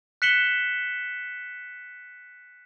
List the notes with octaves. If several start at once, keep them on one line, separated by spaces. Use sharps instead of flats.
F#6 B6 C#7 E7 F#7 G7